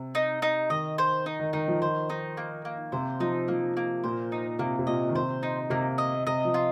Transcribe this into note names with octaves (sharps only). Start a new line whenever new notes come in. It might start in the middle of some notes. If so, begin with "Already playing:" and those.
Already playing: C3
D#4
D#4
D#3 D#5
C5
D#4
D#3
D#3 D#4
F3
D#3 C5
D#4
A#3
A#3
C3 C5
F3 D#4
F3 A#3
A#3
A#2 C5
D#4
C3 A#3
C3
A#2 D#5
D#3
C3 C5
D#4
C3 A#3
D#5
C3 D#5
F3
F4